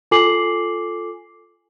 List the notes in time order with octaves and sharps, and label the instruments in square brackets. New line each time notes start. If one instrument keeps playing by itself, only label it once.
[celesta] F4 A4 G#5 D6 C7 F#7